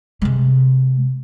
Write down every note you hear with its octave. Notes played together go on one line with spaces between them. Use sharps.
C3 G#3